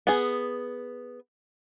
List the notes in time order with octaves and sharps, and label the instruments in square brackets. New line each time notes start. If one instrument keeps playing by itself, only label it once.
[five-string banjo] B3 G#4